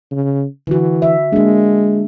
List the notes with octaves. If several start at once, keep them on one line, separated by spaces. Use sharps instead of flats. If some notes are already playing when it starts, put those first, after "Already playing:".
C#3
D3 E3 F#4
E5
G#3 A#3 D4